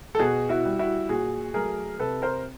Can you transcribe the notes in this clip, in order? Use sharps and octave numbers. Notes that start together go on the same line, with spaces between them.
A4
B2 F#4 G#4
E4 F#4
G3
E4 F#4
A#2 F#4 G#4
F#3 A3 G#4 A#4
C3 A4 B4
A#4 C5